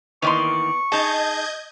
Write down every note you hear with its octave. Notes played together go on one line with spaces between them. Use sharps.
D#3 E3 A#3 B3 D5 C6 C#6
D#4 G#4 D#5 A5 G6 G#6